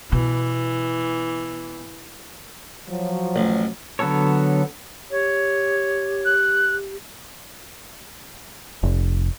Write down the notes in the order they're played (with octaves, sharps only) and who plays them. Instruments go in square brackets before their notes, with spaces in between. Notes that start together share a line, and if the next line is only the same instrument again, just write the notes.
[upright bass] B2 [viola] E3
[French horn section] F3 F#3
[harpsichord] A1
[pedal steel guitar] D3 F#3 B3 A4 C#5
[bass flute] G4 [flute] C#5
[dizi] F#6
[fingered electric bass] F1